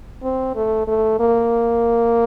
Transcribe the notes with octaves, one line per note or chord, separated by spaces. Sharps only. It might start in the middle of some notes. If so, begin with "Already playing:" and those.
C4
A3
A3
A#3